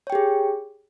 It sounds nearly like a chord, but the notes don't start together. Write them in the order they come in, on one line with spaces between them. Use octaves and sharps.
C#5 G5 G4 G#4